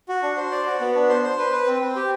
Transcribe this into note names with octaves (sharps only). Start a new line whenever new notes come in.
F#4
D4
C5
D5
F#4
B3
D4
C5
C5
B4
B4
C4
C4
G4